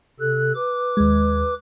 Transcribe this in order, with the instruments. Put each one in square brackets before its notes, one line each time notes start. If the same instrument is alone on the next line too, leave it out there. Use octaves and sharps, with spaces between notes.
[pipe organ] C3 A4 F#6
B4 D6
[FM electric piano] D#2 G#3